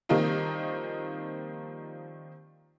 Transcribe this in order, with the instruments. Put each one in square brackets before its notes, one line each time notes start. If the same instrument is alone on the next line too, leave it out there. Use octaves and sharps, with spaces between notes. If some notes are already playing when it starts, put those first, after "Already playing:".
[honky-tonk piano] D#3 F3 G3 A#3 C4 D#4